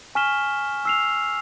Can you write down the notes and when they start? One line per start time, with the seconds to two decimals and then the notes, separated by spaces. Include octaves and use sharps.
0.15 G#5 C#6 F6 B6 E7 G7
0.85 E6 C7 F7